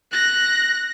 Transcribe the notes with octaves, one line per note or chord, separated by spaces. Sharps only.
F#6 A#6